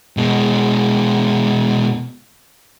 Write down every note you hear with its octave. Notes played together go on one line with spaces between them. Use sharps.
B2 G#3